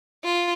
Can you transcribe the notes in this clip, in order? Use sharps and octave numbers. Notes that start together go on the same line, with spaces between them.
F4